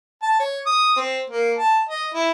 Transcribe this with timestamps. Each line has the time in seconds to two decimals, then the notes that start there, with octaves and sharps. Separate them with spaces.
0.23 A5
0.39 C#5
0.66 D#6
0.96 C4
1.30 A#3
1.58 A5
1.89 D#5
2.14 E4